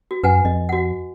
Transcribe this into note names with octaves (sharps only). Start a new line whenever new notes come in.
F#4
F#2 B4 F#5 G#5
F2 D#5
F#4 F#5